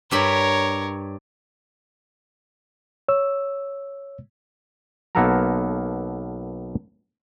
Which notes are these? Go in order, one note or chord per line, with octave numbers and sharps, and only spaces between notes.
G2 G4 A#4 C#5 B5
C#5 E6
B1 A#3 B3 A4 A#4 A#5